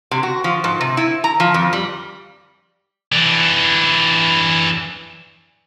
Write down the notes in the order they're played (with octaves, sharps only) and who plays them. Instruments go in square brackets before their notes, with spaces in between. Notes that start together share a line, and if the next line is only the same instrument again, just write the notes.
[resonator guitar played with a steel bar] C3
F#4
F3
G#2
C3
E4
A#5
F3
F2
G3
[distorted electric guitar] E3 D4